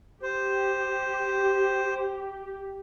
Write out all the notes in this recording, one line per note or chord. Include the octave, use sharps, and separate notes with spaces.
G4 C5